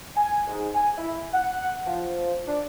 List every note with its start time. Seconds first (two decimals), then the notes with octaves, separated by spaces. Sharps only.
0.16 G#5
0.48 G#2
0.75 G#5
0.98 E4
1.33 F#5
1.86 F3
2.47 D4